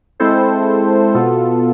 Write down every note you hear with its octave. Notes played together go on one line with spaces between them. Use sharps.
G#3 C4 E4 A4 C5
B2 B3 F4 A4